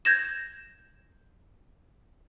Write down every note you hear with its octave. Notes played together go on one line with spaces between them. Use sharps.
G6 G#6 A#6 E7